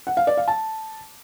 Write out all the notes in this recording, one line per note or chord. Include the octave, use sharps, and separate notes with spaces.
F#5
F5
D5
F5
A5